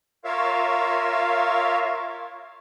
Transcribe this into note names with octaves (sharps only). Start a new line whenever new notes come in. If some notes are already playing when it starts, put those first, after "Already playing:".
F4 A#4 C#5 E5 F5